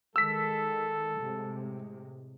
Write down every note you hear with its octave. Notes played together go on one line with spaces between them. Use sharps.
D#3 G#3 A4 E6 B6
A2 C3 G#3